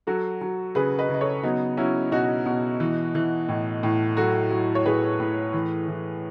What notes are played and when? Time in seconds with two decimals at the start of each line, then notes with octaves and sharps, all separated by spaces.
0.07 F#3 F#4 A4
0.41 F#3
0.75 C#3 G#4 B4
0.98 B4 D#5
1.09 C#3
1.14 D#5
1.21 A4 C#5
1.43 F#3 B3 D#4
1.77 F#3 C#4 E4
2.11 B2 D#4 F#4
2.46 B2
2.80 E3
3.15 E3
3.49 A2
3.83 A2
4.17 F#3 F#4 A4
4.51 F#3
4.75 C#5
4.85 A2 G#4 B4
5.20 A2
5.53 E3
5.88 E3